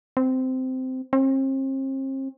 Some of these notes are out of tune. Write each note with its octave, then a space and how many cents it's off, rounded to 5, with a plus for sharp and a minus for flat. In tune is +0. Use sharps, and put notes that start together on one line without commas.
C4 -15
C4 +40